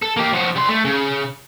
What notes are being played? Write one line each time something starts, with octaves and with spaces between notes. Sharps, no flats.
A4
A#3 G4
F3 F#4
G3 C6
A3
C#3